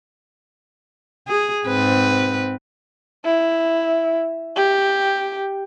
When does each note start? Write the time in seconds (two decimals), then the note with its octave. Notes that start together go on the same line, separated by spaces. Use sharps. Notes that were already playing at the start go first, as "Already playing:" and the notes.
1.27 G#4
1.67 G#2 C4 B4
3.25 E4
4.56 G4